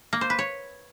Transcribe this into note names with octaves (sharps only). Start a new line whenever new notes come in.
A#3
C5
B4
C#5